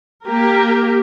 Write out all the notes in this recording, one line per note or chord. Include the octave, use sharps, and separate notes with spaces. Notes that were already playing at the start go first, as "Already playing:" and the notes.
A#3 G4 A#4